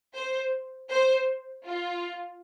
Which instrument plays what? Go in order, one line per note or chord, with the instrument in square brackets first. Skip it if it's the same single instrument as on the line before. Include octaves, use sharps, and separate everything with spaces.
[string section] C5
C5
F4